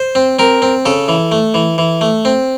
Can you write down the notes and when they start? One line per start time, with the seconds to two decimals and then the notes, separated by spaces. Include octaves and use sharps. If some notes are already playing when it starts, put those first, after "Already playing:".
Already playing: C5
0.15 C4
0.39 C4 A#4
0.62 C4
0.85 C#3 A4
1.08 E3
1.32 A3
1.54 E3
1.78 E3
2.01 A3
2.25 C4